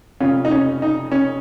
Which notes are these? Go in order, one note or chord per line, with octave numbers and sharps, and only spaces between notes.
F1 F2 C#3 C#4 F4
D#4
C#4
D#4
C#4